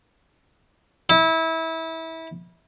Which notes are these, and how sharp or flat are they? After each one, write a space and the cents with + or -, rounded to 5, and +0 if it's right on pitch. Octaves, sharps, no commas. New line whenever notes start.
E4 -25